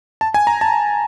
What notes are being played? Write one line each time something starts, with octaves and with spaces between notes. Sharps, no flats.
A5
G#5
A#5
A5